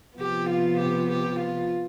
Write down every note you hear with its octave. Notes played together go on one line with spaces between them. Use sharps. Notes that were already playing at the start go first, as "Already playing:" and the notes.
C3 F3 B3 G4
F4
G4
G4
F4